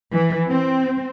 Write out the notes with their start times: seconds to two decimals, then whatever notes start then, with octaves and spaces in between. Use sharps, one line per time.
0.13 E3
0.49 C4